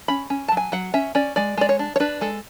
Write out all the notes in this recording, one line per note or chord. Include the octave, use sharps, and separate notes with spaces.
C#4 B5
C#4
A5
F#3
G#5
F#3 F#5
C#4 E5
C#4 D5
G#3 D5
G#3 D5
C#5
D4
C#5
D4 B4
G#3 A4